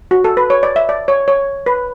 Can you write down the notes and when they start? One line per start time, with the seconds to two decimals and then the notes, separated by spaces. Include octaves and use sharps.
0.11 F#4
0.24 A4
0.37 B4
0.50 C#5
0.63 D5
0.76 E5
0.89 D5
1.08 C#5
1.28 C#5
1.66 B4